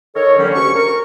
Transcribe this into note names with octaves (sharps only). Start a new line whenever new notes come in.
D#3 A4 A#4 C#5
D3 D#3 F#3 G3 A#3 C#4
D2 C#4 G4 C#6
A#4 C#6